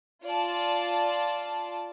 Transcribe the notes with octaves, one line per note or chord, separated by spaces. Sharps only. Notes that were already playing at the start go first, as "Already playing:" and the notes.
F4 D5 A5